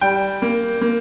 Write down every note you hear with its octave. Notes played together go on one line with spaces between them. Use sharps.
G3 G5
A#3
A#3